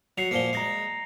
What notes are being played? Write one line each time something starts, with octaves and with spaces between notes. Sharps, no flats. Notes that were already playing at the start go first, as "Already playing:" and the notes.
F#3 C7 C#7 F7
A#2 F3 A#3 C7 G7
G#3 A#5 A#6 C7